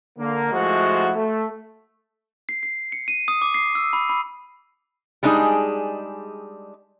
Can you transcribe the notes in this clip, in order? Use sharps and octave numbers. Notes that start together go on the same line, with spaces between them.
D3 A#3
F3 G#3 A3 E4 F#4
A3
C7
C7
C#7
D#7
D#6
D6
C7
E6
B5
B5
G3 G#3 D4 D#4 G#4